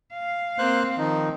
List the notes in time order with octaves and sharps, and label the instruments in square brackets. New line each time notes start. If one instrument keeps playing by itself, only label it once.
[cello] F5
[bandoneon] A#3 C5 F#6 [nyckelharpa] C4
[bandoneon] D#3 F3 D#4